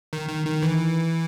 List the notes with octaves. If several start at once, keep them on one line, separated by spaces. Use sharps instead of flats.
D#3
D#3
D#3
E3